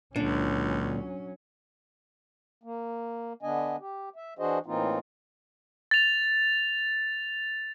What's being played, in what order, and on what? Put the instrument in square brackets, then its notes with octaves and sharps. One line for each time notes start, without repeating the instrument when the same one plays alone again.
[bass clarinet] C#2 [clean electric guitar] A#2 D3 [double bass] F#3 C#4 [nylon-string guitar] D4
[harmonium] A#3
D3 B3 D4 D#5 G#5
G4
E5
E3 D4 F#4 G#4 C5 D#5
A2 E3 A#3 C4 D#4 F4
[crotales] A6 F7